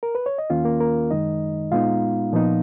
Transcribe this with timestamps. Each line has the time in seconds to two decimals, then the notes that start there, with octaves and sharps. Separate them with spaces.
0.03 A#4
0.15 B4
0.26 C#5
0.38 D#5
0.50 D#2 D#3 A#3 C#4 F4 F5
0.65 A#3 A#4
0.80 A#3 A#4
1.10 F#2 D#3 G#3 D#4 D#5
1.71 A#2 G#3 B3 D#4 F4 F5
2.32 A#2 F3 B3 D#4